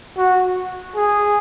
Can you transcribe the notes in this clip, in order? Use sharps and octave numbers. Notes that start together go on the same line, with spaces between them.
F#4
G#4